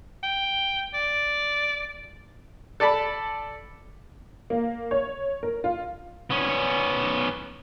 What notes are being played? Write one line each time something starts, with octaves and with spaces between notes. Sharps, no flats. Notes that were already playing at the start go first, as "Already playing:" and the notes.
G5
D5
A4 D5 A5 B5
A#3
C#5
A#4
F4
B3 C#4